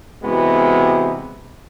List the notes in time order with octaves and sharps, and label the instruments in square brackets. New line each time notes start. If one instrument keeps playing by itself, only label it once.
[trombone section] C3 E3 G#3 B3 F#4